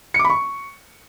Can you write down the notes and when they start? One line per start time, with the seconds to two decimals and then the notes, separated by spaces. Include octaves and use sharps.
0.14 C#7
0.19 D6
0.25 B5
0.30 C#6